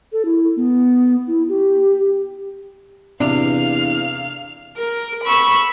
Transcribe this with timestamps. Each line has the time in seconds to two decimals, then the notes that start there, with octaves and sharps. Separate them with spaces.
0.12 A4
0.25 E4
0.56 B3
1.27 E4
1.48 G4
3.20 E2 C3 D4 F5 F6
4.78 A#4
5.25 B5 C#6 E6